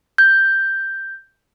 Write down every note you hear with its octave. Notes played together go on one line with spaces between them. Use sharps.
G6